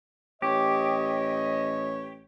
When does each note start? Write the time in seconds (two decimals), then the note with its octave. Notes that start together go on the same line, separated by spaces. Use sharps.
0.42 A1 G4 C#5 D#5